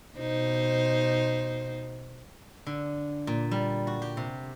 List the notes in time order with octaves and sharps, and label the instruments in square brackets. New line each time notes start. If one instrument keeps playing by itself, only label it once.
[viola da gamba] B2 D#4 C5
[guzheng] D3
A#2
G3
F#4
G4
C3